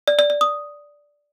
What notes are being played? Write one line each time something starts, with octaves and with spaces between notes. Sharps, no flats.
D5
D5
D5
D#6